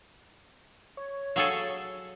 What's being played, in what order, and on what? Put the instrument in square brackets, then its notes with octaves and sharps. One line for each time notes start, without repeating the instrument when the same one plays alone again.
[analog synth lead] C#5
[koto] F#3 G#4 A4 [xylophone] F5 E6